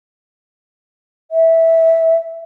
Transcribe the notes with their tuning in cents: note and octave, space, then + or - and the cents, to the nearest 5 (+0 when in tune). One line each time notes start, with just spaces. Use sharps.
E5 -10